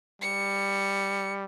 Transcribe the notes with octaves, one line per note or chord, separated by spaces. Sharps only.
G3 C#7